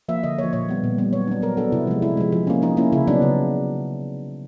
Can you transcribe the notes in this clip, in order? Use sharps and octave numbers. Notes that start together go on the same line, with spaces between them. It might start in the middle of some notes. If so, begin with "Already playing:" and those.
F3 A#3 E5
D3 D#5
F3 A#3 C#5
A#2 C#5
G3 B3
A#2
G3 B3
F#3 C#5
B3 D4
F#3 A#4
B3 D4 A4
C3 E4
F3 G#3
C3 E4
F3 G#3
F3
A#3 C#4
F3 D#4
A#3 C#4 E4
C#3 E4
F#3 B3 D4 D#4
C#3